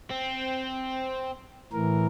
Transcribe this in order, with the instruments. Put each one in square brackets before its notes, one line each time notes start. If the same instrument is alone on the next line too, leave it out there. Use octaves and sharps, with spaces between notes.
[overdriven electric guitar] C4
[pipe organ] A2 E3 A#4